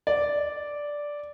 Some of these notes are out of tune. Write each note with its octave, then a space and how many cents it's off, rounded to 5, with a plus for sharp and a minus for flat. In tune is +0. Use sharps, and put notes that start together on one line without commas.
D5 -5